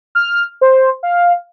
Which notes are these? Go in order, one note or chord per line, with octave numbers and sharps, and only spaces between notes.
F6
C5
F5